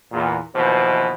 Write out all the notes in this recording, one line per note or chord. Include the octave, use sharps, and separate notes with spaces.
E2 A#2
D#2 B2 E3 F3 C5